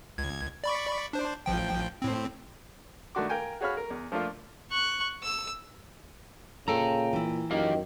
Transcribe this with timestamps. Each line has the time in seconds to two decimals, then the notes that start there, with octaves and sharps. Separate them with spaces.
0.18 C#2 G#6
0.64 D5 B5 C#6
1.13 D4 C5
1.46 A1 F3 G5
2.02 A2 C4
3.15 D#3 A3 D4 F#4 C6 D6
3.29 A#4 F5 G5 G#5
3.61 F#4 G#4 C#5 F5 B5 F6
3.77 A#4
3.90 E2
4.12 F3 A3 A#3 D4 F4
4.71 C#6 F#6
5.23 E6
6.68 A#2 C#3 A4 G5 A#5
7.13 E3 E4
7.51 F#2 D#3 G4 A#4 F5